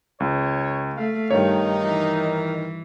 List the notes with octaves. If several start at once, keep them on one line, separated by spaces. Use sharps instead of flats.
C#2 C#5
A3 F5
G2 D#3 D#4 C#5
E3